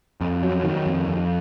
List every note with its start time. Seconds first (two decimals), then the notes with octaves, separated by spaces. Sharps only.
0.21 F2
0.43 F#3
0.64 D#3
0.86 F2
1.07 F2